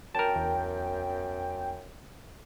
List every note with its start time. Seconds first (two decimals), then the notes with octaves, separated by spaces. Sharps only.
0.15 F#2 A#4 G5 A5
0.36 E2